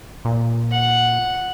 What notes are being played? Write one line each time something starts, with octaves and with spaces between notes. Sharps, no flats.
A#2
F#5